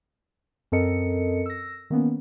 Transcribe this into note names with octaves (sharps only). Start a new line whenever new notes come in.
F#2 C4 A4 A#4 D#5 C#7
E6 A#6
D#3 A#3 B3 C#4